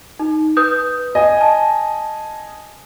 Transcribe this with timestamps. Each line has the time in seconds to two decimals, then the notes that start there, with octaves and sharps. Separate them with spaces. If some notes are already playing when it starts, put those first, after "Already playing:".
0.19 D#4
0.57 B4 D#6 G6
1.15 D#5 G#5
1.41 A5